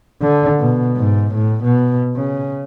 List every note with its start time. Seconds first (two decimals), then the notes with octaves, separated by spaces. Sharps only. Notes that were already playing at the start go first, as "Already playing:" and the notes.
0.21 D3
0.60 B2
0.97 G#2
1.34 A2
1.64 B2
2.16 C#3